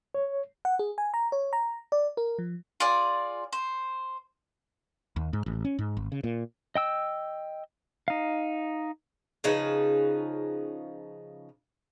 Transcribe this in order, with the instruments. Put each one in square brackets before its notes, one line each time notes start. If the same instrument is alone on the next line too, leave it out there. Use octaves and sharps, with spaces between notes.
[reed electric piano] C#5
[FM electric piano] F#5
G#4
G#5
A#5
C#5
A#5
D5
A#4
F3
[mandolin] F4 G#4 D5
C5
[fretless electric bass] D#2
G#2
A1
C#4
G#2
G#1
C#3
A#2
[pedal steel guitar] D#5 G5 E6
D#4 F5
[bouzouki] C#3 F3 D#4 B4